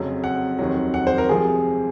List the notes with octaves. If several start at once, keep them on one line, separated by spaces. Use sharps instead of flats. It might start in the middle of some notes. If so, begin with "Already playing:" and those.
Already playing: F1 F2 C#3 F#3
F#5
F1 D#2 D#3 F#3
F#5
C5
A#4
F2 C3 F3 G#3 G#4